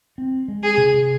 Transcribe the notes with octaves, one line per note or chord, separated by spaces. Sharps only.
C4
G#3
G#4
C3